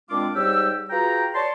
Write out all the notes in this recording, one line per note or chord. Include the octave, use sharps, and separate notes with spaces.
A#2 G#3 C4 D4 F4 D6
G#2 G3 G4 C#5 G5 E6
F4 F#4 G#4 B4 G5 A#5
C#5 D5 A5 C6